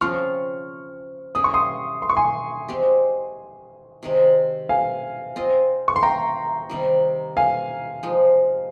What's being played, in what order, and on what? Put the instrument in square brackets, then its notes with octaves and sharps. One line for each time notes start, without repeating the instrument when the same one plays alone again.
[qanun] C#3 F3 C4 F4 [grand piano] C#6 F6
[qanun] G3 C#4 G#4 [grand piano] D#6
[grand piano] C#6
C6 D#6
C6
C#6
G#5 C6
[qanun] G#3 C4 G4
C3 D#3 G#3
[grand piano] F5 G#5
[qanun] C4 F4 C5 D#5
[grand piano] C#6
C6
G5 A#5
[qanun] C3 D#3 G3
[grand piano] F5 G#5
[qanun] F3 G#3 D#4